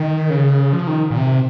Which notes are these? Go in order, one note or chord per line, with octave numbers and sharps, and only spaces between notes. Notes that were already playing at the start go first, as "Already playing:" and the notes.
Already playing: D#3
C#3
F3
D#3
A#2
C3